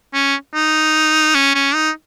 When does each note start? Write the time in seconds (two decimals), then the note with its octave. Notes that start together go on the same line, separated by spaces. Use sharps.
0.14 C#4
0.54 D#4
1.35 C#4
1.55 C#4
1.75 D#4